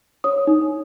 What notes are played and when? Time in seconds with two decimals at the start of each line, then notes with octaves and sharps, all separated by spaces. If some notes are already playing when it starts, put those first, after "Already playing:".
0.24 C#5 D#6
0.47 D#4